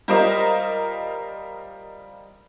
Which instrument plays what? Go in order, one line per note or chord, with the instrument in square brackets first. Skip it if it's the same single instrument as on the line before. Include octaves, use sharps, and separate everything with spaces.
[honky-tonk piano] G3 F4 A#4 C5 D#5